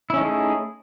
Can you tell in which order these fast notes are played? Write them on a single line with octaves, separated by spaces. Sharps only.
E4 C#4 D#4 A3 G#4